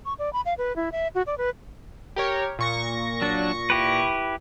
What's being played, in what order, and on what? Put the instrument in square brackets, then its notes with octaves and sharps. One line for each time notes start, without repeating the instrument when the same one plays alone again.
[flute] C#6
D5
B5
F5
B4
E4
E5
F#4
D5
B4
[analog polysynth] G4 A#4 C#5
A#2 C#6 A#6
[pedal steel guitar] F#3 D4
E4 G4 B4